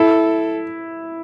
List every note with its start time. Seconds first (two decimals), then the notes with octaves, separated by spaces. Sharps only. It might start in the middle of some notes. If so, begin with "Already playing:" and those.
Already playing: E4 A4